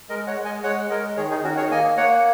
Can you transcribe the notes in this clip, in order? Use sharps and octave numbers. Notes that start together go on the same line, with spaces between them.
G#3 A#4 D#5
C#5 F#5
G#3
D#5 G#5
G#3 C#5 F#5
G#3 A#4 D#5
D#3 G#4 C#5
D#4 G#4
D#3 C#4 F#4
G#4 C#5
A#3 D#5 G#5
A#3 C#5 F#5